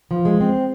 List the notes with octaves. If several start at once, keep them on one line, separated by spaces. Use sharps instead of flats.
F3
G#3
C4